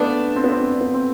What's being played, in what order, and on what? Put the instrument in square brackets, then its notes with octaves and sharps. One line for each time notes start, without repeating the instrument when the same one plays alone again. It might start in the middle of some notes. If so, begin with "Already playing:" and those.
Already playing: [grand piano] A3 B3 [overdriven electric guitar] D4
[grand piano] C4
B3
C4
B3
C4